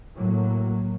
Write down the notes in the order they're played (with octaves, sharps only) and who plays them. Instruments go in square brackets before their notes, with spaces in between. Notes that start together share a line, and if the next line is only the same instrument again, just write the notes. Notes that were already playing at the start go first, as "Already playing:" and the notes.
[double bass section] A2 F#3 A#3